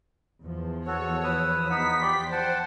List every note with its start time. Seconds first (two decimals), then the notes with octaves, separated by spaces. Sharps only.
0.43 E2 F3
0.87 F#4 A4 C#5
1.24 B4 D#6 E6
1.70 B3 D#4 F#5 B6
2.02 G4 D5 C6
2.32 C5 F#5 G5 A5